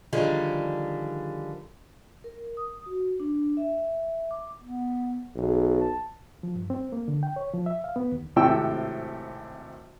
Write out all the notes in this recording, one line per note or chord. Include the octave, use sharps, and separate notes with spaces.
D3 D#3 F3 G3 G#4
A#4
D#6
F#4
D4
E5
D6
B3
B1 G#4
A5
F3
G2
C4
A#3
D3
G5
C#5
F3
E5
F5
B3
D#2
G#1 A2 C3 C4 G5 E6